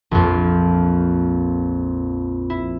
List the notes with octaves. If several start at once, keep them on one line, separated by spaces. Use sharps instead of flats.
A#1 F2
E4